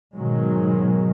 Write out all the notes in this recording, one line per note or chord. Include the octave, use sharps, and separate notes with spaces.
G#2 B2 D#3 F#3 G#3